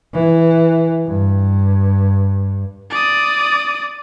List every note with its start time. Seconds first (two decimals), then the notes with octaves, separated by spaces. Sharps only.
0.13 E3
1.06 G2
2.90 D5 D#6